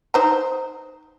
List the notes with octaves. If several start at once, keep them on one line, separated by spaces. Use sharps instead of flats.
D#4 C5 A#5